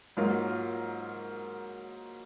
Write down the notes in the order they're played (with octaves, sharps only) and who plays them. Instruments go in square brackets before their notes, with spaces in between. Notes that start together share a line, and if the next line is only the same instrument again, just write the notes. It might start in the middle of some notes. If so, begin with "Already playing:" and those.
[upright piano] G#2 F#3 A#3 F4 A#4